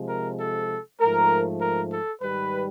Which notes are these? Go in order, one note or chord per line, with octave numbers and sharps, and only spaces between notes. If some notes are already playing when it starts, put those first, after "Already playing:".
Already playing: C3 F3 G#3
A#4
A4
G#2 F3 A3 A#4
A#4
A4
G#2 D#3 G3 B4